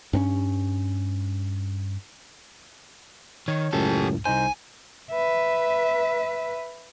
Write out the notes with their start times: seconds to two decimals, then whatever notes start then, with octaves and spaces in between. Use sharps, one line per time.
0.13 G2 C4 C#4
3.48 D#3 C#5
3.73 C#2 F#2 A2 G4 A4
4.25 C2 D#4 C5 G#5
5.11 B4 E5